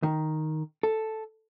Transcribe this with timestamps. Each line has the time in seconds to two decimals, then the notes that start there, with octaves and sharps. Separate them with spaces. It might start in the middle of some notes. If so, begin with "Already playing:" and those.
0.03 D#3
0.83 A4